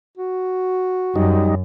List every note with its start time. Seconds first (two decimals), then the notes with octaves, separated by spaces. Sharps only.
0.17 F#4
1.16 F#2 G3 D#4